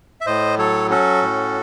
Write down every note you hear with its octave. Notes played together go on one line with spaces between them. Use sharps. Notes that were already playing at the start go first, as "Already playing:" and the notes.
E5
A2 C5 D#5
F#3 A4 C#5
C#4 F#4 A4
A2